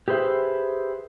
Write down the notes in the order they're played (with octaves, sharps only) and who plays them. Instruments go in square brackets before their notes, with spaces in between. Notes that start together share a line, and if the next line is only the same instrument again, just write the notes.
[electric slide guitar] G4 G#4 B4 C5 E5